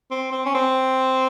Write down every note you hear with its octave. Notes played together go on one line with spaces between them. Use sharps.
C4
C4
C#4
C4